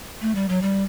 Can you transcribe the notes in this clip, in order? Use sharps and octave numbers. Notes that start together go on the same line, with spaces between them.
A3
G3
F#3
G3